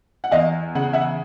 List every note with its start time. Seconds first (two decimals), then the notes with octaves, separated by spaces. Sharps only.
0.24 F#5
0.31 E2 D#5 F5
0.75 C#3 F#5
0.93 E5 F#5